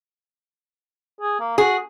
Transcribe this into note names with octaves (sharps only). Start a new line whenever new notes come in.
G#4
A#3
F#4 G#4